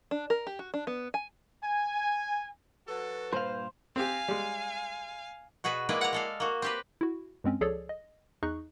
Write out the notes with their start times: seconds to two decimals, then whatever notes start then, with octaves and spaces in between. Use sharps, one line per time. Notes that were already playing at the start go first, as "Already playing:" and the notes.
0.11 D4
0.30 A#4
0.47 G4
0.59 F#4
0.74 D4
0.87 B3
1.14 G#5
1.63 G#5
2.88 F#3 F#4 A4 B4
3.33 G2 A#2 C5 F5
3.96 C4 G4 F5 G#5
4.28 G3 G#3
5.64 B2 F#4 G#4 B4
5.89 G#3 A#3 E4 B4 D5 F#5
6.01 F#5 A#5
6.13 G#3 A4 F5
6.40 A#3 F#4
6.62 C4 G4 B4
7.01 E4 F#4
7.44 G2 G#3 C4 C#4
7.61 C#2 F3 G#4 A4 C#5 D5
7.89 D#5
8.43 E2 D#4 G#4 D#5 C#6 F#6